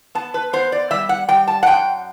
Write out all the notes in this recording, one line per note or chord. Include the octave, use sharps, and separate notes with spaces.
B3 A5
B4
B3 C5
D5
G3 E5
F#5
G3 G5
A5
F#5
F#2 G5